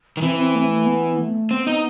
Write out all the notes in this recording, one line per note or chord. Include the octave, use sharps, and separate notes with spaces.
D#3
E3 C4
C4
A3
A3
B3
A3
B3 C4
D#4